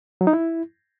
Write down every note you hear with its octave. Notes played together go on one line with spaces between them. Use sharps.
F#3
D#4
E4